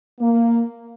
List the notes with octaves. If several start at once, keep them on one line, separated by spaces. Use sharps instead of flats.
A#3